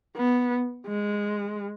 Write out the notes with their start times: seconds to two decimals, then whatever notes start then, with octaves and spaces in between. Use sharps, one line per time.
0.17 B3
0.87 G#3